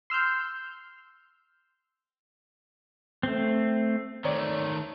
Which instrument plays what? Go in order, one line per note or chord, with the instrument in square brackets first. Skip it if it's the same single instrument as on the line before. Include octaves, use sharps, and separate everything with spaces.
[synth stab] C6 E6 F6 G6
[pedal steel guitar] A3 C4
[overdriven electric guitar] D#3 A3 [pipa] C4 C#5 D5